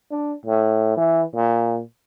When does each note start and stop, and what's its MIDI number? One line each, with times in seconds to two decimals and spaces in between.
0.12 0.33 62
0.46 0.93 45
0.97 1.22 52
1.34 1.81 46